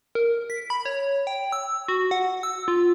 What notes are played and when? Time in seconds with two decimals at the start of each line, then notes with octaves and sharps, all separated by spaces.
0.15 A#4
0.50 B6
0.70 B5
0.85 C#5
1.27 G5
1.52 E6
1.88 F#4
2.11 F#5
2.43 E6
2.68 F4